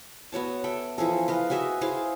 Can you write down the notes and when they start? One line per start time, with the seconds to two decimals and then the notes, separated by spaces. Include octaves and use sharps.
0.32 B3 F#4 C#5 A5
0.64 A4 E5 G5
0.98 E3 F3 G#4 A4
1.28 B4 D#5 F5
1.50 F#4 G#4 D#5 E5
1.81 E4 G#4 C5 F5